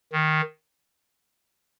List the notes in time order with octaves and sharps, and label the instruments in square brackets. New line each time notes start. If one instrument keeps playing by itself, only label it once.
[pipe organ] D#3